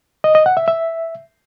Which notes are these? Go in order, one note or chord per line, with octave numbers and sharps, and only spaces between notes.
D#5
D#5
F#5
E5
E5